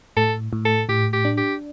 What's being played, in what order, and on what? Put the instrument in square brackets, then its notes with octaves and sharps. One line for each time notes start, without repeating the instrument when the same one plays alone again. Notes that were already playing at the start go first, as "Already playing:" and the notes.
[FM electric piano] A2 [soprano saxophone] A4
[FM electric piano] A2
[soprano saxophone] A4
[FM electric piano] A2 [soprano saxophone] G4
[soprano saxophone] G4
[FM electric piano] D4
[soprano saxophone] G4